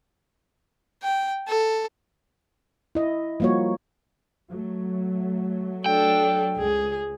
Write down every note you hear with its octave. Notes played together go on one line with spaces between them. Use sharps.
G5
A4
E4 D#5
F3 G3 A#3 F#4 C#5
F#3 A3
D4 A4 G5
C#2 G#4